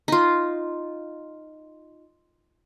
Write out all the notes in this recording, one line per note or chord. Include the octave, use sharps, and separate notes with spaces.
D#4 F4